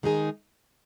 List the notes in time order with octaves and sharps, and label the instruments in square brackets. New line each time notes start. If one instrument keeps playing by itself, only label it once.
[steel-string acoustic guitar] D#3 G#3 D#4 G#4